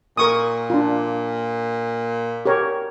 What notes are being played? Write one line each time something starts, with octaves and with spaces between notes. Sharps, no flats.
A#2 A#4 C#6 D#6
D4 F4
G4 A#4 C#5